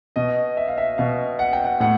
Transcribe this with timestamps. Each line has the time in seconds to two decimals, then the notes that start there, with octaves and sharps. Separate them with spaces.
0.16 B2 D#5
0.57 E5
0.68 F5
0.78 E5
0.98 B2 F5
1.39 F#5
1.53 G5
1.65 F#5
1.80 A2 F#5